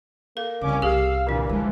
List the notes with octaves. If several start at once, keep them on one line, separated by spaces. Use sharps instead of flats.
A#3 A4
C2 C#3 C#4 D6
C2 G4 G#4 F5 E6
A#2 D3 E3 A#3 D4
E3 F3 G#3